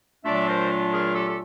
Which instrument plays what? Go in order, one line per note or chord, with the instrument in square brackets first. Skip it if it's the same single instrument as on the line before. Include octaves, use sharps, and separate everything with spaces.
[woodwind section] A#2 F#3 A3 D4 F4 D5 E5
A#4 C5
G#4 A#4
G4 A4
A4